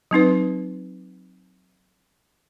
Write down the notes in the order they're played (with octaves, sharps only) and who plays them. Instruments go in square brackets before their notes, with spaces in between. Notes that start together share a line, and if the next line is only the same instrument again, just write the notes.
[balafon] F#3 C4 D#4 B4